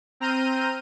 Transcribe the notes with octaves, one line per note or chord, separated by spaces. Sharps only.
C4 A#5 F6 G6 D#7